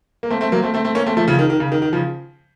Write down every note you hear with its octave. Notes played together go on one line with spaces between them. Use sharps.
A#3
A3 C4
A3 C4
F#3 A#3
A3 C4
A3 C4
A3 C4
A#3 C#4
A3 C4
F3 A3
C#3 F3
D#3
D#3
C#3
D#3
D#3
C#3 F3